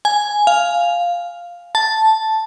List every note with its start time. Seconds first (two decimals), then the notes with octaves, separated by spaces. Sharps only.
0.05 G#5
0.47 F5
1.75 A5